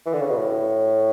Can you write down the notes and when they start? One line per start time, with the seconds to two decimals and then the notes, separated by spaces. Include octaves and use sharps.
0.06 E3
0.13 D3
0.22 C#3
0.30 B2
0.38 A2